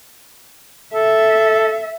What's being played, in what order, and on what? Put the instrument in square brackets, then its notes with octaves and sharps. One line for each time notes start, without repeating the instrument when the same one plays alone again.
[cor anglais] A4 [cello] E5